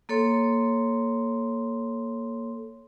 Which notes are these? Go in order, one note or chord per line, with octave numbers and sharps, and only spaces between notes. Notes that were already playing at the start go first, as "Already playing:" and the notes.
A#3 A4 C#5 C6